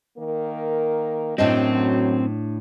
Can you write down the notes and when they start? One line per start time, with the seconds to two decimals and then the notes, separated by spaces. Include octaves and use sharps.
0.18 D#3 A#3 A#4
1.38 F#2 A2 F#3 C4 D4 D#5